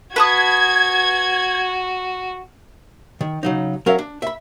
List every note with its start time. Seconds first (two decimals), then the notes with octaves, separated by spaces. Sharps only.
0.16 F#4 B4 A5 D#6 G#6
3.21 D#3
3.43 C#3 F#3 D#4
3.86 F#3 C#4 A#4 E5 F5
3.99 D4
4.22 E5 B5